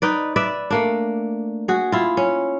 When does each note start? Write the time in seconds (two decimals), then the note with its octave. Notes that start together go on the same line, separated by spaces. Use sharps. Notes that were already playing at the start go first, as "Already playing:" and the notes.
0.02 D#4 B4 D5
0.36 B4 D5 E5
0.70 A3 A#3 D4
1.68 F#4 G#4
1.92 E4 F4
2.17 C#4